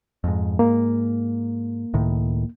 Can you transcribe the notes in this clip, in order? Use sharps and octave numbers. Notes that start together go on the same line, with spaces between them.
F2 G#2
G#2 A#3
C#2 A2 D#3